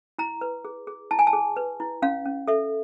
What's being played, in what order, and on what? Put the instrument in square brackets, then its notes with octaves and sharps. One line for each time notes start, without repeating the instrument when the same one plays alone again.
[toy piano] E4 A#5
B4
G#4
G#4
E4 A5
G#5
A5
G#4
B4
E4
C#4 F5
C#4
A4 E5